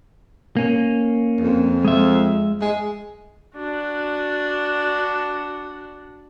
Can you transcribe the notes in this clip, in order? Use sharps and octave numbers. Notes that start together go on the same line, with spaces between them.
A#3 C#4
F2
G#3 E5
G#3
D4 F#4